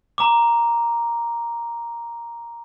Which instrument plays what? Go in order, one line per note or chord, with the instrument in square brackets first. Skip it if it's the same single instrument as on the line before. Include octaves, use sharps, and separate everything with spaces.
[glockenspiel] A#5 D6